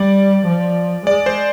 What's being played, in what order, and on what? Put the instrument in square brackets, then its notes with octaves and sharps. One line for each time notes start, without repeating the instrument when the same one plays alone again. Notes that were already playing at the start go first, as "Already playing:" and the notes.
Already playing: [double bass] G3 [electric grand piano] D5
[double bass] F3
[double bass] G#3 [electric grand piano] D5
[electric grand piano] C5